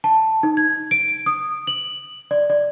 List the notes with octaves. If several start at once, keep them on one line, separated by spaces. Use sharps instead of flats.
A5
D#4
G#6
D7
D#6
F#7
D5
D5